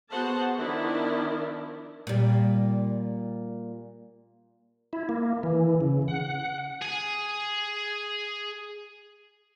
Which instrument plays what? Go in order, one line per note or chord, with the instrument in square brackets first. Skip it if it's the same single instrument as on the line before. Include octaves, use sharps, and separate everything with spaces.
[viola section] B3 F#4 G#4 C5 F#5 A5
D#3 F3 B3 D4 E4 A#4
[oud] A#2 G3
[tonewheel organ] E4
A#3
E3
C#3
F#5
[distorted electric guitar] G#4 G#5